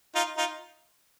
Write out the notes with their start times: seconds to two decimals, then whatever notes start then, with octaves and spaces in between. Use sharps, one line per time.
0.15 D#4 F4
0.38 D#4 F4